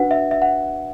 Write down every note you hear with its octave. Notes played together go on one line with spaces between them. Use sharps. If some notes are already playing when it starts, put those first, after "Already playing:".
Already playing: D4 F#4 B4 F#5
E5
E5
F#5